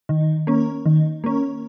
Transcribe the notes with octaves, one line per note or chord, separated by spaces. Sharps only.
D#3
A#3 C#4
D#3
A#3 C#4